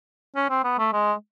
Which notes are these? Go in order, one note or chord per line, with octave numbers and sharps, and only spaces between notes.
C#4
C4
B3
A3
G#3